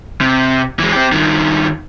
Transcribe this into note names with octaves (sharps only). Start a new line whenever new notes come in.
C3
E3 G#3
C4 G4
G2 D#3